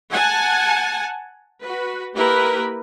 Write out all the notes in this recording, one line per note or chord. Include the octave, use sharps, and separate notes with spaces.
F#5 G#5 A5
F#4 B4
A#3 E4 G4 A#4 B4